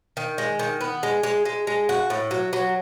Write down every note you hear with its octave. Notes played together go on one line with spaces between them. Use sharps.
D#3
G#3
D#3
B3
G#3
G#3
G#3
G#3
F#4
A2
F#3
F#3